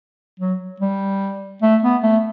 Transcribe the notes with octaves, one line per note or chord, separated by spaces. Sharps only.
F#3
G3
A3
B3
A3